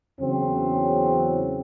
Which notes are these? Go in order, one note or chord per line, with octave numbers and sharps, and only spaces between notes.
E2 C#3 F#3 C4